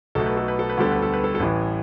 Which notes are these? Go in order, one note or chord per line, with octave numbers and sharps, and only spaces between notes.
B1 B2 A3 A4
B4
A4
B4
A4
B4
D2 D3 G3 B3 A4
B4
A4
B4
A4
A4
A1 A2 E3 B4